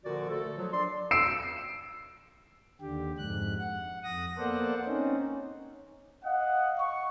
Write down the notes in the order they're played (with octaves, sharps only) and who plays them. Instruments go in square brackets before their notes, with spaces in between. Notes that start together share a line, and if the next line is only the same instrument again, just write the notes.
[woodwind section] A#2 D3 F3 F#4 D5
A3 A4
F3 F#3
D4 D5 C6
[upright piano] E6 C7 D7 E7
[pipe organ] D#2 D3 G4
F2 G#2 F#6
F#5
F2 D#6 A#6
A#3 B3 A4 C5 D5 F#5
C4 C#4 D#4
[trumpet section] D#5 F5 F#5
C#6